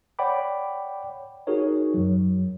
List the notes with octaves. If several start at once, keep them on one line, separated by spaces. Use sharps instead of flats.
C#5 D5 F#5 G5 B5 D6
D#4 F#4 G#4 A#4 C#5
F#2 F#3